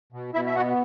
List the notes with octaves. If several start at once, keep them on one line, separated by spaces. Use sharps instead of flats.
B2
B2 E4 E5
E5
B3 F#4 F#5